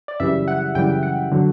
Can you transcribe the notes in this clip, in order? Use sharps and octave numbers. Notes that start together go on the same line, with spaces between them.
D5
F#2 C#3 E3 G3 E5
F#5
F#2 C#3 E3 G3 G5
F#5
D3 F#3